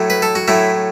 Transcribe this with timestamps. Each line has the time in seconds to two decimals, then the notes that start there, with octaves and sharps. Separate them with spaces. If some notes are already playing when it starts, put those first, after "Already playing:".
Already playing: A2 F#3 A3
0.10 B4
0.22 A4
0.35 F#4
0.48 A2 F#3 A3 E4